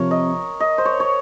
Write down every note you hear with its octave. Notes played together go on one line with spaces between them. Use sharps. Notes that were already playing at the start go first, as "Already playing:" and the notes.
Already playing: C3 F3 C4 A#4 C#5
D#5
D#5
C5
C#5
C#5